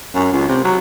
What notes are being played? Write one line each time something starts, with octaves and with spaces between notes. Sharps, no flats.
F#2
C#2
C3
F#3